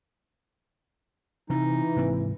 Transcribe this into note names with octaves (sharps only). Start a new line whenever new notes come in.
C3 E3 D#4
G#2 C3 C4